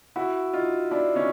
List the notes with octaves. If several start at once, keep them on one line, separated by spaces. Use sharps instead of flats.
E4 F#4
D#4 F4
D4 E4
C#4 D#4